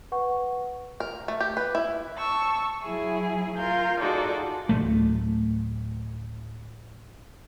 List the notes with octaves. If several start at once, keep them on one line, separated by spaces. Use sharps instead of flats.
B4 F#5 C#6
A#4
A3
G4
B4
E4
A5 C#6 E6
F#3 E4 G#4
F4 A#4 F5 G6
D#4 F4 F#4 G#4 A4 D5
D1 B1 A3